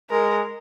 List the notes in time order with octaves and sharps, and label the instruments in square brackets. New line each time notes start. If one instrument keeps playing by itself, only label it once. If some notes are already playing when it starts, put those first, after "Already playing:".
[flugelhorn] G#3 [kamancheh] A#4